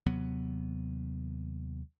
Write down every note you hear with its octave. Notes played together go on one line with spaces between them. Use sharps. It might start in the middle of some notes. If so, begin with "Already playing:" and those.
D#2 C3 F#3 B3